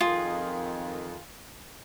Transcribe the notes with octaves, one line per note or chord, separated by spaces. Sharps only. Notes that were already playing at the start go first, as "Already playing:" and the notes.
F2 D#3 F4 G#4